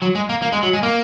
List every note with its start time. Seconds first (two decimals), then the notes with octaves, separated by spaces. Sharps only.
0.02 F#3
0.15 G#3
0.29 A#3
0.42 A#3
0.52 G#3
0.63 F#3
0.73 G#3
0.83 A#3